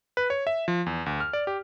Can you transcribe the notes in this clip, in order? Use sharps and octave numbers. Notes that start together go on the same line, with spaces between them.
B4
C#5
E5
F3
E2
D2
F6
D5
G4